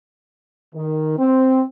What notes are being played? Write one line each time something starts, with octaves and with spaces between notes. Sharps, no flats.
D#3
C4